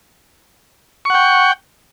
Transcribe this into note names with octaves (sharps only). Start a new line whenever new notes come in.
F#5 G5 C#6